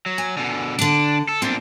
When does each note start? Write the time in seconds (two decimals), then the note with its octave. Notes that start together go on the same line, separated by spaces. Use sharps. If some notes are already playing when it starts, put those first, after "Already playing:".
0.06 F#3
0.18 G#5
0.37 B2 D3
0.79 D3 D4 A5
1.29 A4
1.42 A#2 C4 D4 A4